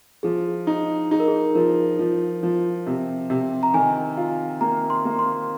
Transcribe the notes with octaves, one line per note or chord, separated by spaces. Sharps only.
F3 G#4
D#4
D#4 G#4
A#4
G#4
F3 A#4
F3
F3
C3
C3
A#5
D#3 G#5
F4
A#3 A#5
C6
A#3
C6